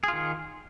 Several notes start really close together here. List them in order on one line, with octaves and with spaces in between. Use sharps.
G#4 F4 D#3